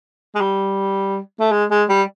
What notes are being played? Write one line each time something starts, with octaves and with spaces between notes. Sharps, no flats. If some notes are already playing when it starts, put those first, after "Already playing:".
G#3
G3
A3
G#3
G#3
G3